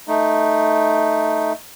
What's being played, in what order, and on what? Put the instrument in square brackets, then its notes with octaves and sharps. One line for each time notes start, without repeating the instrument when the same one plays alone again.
[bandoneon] A3 D#4